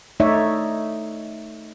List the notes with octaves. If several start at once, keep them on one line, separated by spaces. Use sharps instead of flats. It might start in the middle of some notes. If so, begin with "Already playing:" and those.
A3 D#4 C#5 D5 E5